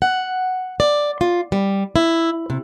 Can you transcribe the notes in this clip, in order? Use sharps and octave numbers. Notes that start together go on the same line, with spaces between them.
F#5
D5
F4
G3
E4
C3